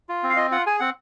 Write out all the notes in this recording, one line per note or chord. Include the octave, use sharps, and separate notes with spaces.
F4
C4
F5
F4 D#5
F4 F#5
G#4 G#5
C4 F#5